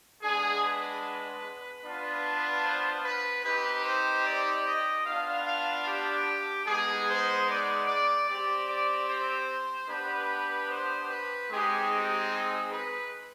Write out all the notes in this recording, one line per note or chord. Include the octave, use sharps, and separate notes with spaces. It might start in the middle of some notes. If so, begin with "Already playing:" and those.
G#3 B3 D4 G#4
B4
B3 D4 F4
C5
B4
C4 D#4 G4 B4
C5
D5
D#5
B3 D4 F4 F5
F5
G4
G#3 B3 D#4 G#4
C5
D5
D5
C4 G4 D5
D5
C5
B3 D4 G4 B4
C5
B4
G#3 C4 D#4 G4 G#4
G4
G#4
B4